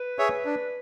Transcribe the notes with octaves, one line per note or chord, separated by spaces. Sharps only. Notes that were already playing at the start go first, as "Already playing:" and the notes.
Already playing: B4
G#4 C#5 E5
D4